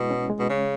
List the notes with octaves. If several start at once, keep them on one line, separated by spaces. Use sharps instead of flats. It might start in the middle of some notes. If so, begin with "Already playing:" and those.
Already playing: B2 G#3 E4
C#4
G#3
B2
C#3 C#4